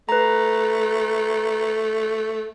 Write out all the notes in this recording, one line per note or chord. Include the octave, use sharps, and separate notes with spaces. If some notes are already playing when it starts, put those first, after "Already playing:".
A3 B4 A#5